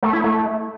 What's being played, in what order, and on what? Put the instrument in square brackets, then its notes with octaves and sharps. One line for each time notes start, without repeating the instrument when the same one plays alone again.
[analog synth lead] A3
E4
A3